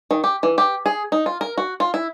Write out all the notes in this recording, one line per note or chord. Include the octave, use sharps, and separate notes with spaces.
D#3
G4
E3
G4
G#4
D#4
F4
A#4
F#4
F4
E4